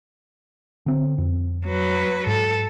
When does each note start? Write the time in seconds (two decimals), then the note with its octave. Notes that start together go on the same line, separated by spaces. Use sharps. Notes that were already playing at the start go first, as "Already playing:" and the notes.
0.86 D3 C4
1.18 F2
1.66 F#3 B4
2.27 G#2 A4